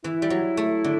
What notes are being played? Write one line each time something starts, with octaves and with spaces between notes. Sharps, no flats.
E3 E4
G3
F#3
A3
D3